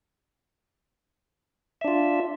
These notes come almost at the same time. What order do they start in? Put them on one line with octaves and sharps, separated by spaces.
E5 D4 F4